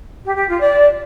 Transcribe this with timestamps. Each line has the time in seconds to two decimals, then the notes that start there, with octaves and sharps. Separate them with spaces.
0.24 G4
0.36 G4
0.47 F4
0.59 D5